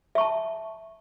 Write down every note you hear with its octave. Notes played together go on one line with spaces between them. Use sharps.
E5 A5 C#6